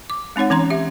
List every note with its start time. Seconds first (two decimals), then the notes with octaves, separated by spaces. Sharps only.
0.10 D6
0.36 G#3 C4 D#4 C#5 F#5
0.50 E3 C#4 A#5 C6
0.70 G4 E5